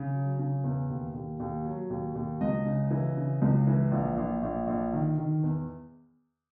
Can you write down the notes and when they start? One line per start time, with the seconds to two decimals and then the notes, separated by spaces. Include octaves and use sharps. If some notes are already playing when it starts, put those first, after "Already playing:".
Already playing: C#3
0.14 F#3
0.39 C#3
0.64 E2
0.90 D#2
1.14 D#2
1.40 D#2
1.65 F#3
1.90 D#2
2.15 D#2
2.41 C#2 D#5
2.65 C#3
2.91 E3
3.17 C#3
3.42 C#2
3.67 E3
3.91 A#1
4.17 A#1
4.43 A#1
4.67 A#1
4.93 D#3
5.18 D#3
5.43 E2